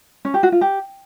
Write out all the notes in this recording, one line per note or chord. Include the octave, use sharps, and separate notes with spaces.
C#4
G4
F#4
F4
G4